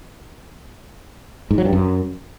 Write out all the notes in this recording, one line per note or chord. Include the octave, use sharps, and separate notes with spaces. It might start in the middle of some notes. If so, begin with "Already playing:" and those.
G#2
F#3
G2
F#2